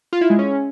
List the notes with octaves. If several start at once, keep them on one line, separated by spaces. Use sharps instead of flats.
F4
E4
G#3
C#4